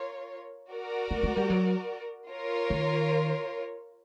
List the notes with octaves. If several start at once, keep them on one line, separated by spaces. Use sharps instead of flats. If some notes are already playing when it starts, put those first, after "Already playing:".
Already playing: F4 A#4 C#5
F#4 A#4 D5
A3
G#3
G3
F#3
F4 A#4 C#5
D#3